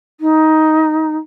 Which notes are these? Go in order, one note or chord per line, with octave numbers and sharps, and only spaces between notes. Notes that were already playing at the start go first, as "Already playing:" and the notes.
D#4